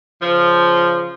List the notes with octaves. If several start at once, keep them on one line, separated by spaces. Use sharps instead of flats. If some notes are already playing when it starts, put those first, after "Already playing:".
C#3 F3